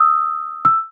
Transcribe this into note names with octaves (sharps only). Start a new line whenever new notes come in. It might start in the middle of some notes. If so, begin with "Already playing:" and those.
Already playing: D#6 E6
E6